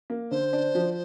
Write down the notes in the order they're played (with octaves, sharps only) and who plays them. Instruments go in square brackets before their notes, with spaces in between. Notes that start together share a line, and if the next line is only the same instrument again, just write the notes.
[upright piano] A#3
[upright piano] D3 [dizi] C5
[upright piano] D4
F3